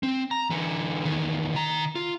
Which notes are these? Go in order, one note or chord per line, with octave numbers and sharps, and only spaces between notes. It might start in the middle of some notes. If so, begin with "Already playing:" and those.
C4
A#5
D3 E3
E2 D#3
D#3 A#5
F4